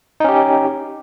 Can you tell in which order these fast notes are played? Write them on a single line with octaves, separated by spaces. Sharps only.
D#4 C#4 G4